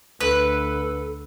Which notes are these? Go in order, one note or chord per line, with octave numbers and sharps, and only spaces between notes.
D2 A4 B4